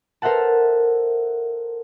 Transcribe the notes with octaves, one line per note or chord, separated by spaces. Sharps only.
A4 A#4 C5 E5 F#5 A5